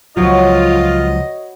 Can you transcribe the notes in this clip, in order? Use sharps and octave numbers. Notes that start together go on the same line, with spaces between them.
C#2 F3 F#3 F4 F#4 B4 C#5 D#5